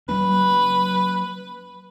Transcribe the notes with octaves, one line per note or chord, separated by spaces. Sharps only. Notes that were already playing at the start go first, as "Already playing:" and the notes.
F#3 A#3 C#4 B4